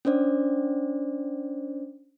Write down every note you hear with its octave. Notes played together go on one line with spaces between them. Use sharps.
C#4 D4 C5 D5